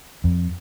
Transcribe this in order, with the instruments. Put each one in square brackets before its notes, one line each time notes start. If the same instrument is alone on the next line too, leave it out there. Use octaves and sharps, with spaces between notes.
[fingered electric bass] F2